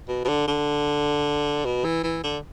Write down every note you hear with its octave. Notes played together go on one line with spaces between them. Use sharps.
B2
B2
D3
D3
B2
E3
E3
D3